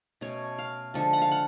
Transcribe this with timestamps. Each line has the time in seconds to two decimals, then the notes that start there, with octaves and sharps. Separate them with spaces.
0.21 B2 A3 C#4 C#5
0.58 F5
0.94 D3 F3 G#3 A4
1.13 F#5
1.22 F5
1.31 F#5